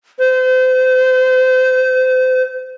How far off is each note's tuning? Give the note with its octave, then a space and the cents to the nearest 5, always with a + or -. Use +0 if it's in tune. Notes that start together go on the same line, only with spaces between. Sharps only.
C5 -30